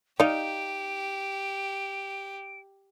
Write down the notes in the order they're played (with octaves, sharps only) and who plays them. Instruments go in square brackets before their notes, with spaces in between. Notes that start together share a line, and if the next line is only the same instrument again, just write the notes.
[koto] D#4 [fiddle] G4 [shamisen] D5 F5 [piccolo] D7